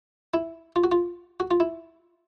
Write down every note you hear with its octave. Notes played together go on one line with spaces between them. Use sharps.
E4
F4
F#4
F4
F#4
F4
E4